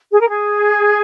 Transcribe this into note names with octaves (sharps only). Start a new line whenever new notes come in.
G#4
A#4
G#4